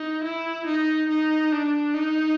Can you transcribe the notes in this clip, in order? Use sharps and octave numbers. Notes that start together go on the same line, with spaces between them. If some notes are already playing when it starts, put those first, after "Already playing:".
Already playing: D#4
E4
D#4
D#4
D4
D#4